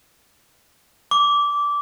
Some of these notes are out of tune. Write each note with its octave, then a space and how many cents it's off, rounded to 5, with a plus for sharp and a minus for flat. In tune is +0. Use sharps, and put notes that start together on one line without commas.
D6 -15